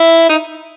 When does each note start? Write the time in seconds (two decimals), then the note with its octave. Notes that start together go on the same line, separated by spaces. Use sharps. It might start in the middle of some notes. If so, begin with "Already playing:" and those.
Already playing: E4
0.29 D#4